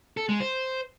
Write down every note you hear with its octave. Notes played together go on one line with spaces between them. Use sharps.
A4
G#3
C5